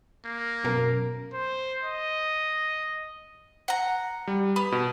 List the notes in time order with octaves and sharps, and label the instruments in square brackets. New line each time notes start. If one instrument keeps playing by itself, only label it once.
[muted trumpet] A#3
[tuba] F#2 [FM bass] B2 [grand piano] A#4
[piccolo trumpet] C5
D#5
[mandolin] F#5 A#5
[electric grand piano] G3
[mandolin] B3 [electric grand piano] B5
[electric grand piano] B2